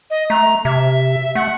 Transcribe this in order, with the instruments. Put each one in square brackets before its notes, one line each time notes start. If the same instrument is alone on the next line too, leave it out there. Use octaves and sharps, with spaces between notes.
[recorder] D#5
[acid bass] A3 [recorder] A#5
[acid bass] C3 [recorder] E5
[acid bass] A3 [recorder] F#5